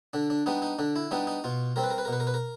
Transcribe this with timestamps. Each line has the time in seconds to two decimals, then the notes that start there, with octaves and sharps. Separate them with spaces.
0.13 D3 D4
0.30 D4
0.46 G3 B3 D4 D#4
0.62 D#4
0.79 D3 D4
0.96 E4
1.11 G3 B3 D4 D#4
1.27 D#4
1.44 B2 F4
1.76 G3 C4 A#4
1.83 B4
1.91 A#4
1.98 B4
2.05 A#4
2.08 B2 B4
2.20 A#4
2.27 B4
2.34 A#4